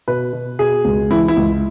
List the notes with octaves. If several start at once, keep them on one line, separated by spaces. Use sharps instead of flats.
B2 B4
B2
B2 G#4
C#2
E3 E4
E4
C#2